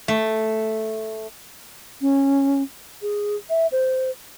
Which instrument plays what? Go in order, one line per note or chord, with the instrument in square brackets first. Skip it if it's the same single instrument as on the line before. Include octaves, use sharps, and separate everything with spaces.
[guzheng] A3
[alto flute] C#4
G#4
E5
C5